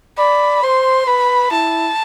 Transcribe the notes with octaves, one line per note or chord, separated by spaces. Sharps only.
D5 B5
C5 C6
B4 B5
E4 A5